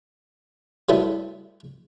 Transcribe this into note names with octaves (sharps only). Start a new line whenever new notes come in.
F#3 G3 A3 B3 E4